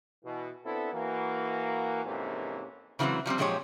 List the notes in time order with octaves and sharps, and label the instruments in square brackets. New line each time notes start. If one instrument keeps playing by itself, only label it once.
[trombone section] B2 E3
B3 C4 D4 E4 A4
E3 A#3 F#4
F2 G#2 C3 E3 A#3 C#4
[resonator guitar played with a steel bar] C#3 E3 F#3 G#3 C4
F3 G3 B3 C4
A#2 F3 F#3 G#3 G4 C#5